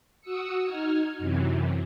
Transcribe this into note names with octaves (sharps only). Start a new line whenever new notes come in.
F#4 D#6 E6 C#7
D#4 F6 G#6
F#2 C3 E3